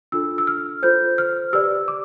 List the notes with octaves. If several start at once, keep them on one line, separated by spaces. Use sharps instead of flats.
D4 F4 A4 E6
E6
F6
F4 A4 C5 G6
F6
G4 B4 D5 E6
D6